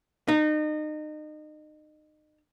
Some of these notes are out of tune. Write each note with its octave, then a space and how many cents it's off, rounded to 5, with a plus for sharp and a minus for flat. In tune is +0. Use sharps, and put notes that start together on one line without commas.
D#4 -30